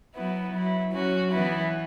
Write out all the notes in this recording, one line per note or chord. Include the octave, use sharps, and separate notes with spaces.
F#3 B3 E4
F#3 E4
F#3 C#4 F#4
E3 B3 E4